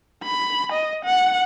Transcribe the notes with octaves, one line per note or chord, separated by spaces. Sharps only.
B5
D#5
F#5